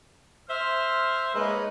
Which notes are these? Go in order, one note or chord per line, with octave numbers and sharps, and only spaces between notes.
C5 E5 C6 F6
G#3 A#3 D#4 B4 C#5